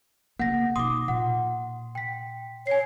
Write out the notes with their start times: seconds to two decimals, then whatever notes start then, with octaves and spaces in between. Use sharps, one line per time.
0.40 C#3 A#3 B3 F#5 A#6
0.76 B2 D#4 C6 D6 D#6
1.08 A#2 F#5
1.95 G5 B6
2.67 C#5 G#5 C7